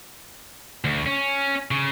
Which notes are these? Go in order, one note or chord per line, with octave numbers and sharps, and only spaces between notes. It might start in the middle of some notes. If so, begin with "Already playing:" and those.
D2
C#4
C#3